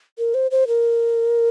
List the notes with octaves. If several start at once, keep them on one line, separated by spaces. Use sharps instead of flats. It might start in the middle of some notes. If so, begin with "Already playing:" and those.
A#4
C5
C5
A#4